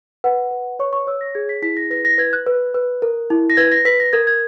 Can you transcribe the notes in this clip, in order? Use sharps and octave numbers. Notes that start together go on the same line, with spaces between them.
B4 F#5
B4
C#5 C#6
C#6
C#5 E6
A#6
G#4 G#6
B6
E4 B6
A#6
B4 A#6
A#6
B4 G#6
F#6
B4
B4
A#4
E4
A#6
B4 G#6
A#6
B4 B6
A#6
A#4 G#6
G#6